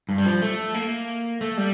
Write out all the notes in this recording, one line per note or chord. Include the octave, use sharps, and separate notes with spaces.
G2
G3
F3
A3
A#3
A3
G3